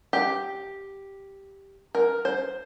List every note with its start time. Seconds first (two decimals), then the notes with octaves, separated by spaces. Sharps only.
0.13 G4
1.95 A#4
2.25 C5